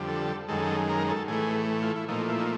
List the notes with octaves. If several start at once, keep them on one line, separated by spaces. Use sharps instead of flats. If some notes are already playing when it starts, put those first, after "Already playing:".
Already playing: F2 D3 G3
A4
F#2 D#3 G#3 A4
A#4
A4
A2 E3 A3 G#4
F4
E4
A#2 F3 A3 D#4
E4
D#4